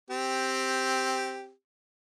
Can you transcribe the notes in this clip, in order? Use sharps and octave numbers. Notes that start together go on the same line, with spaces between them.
C4 G4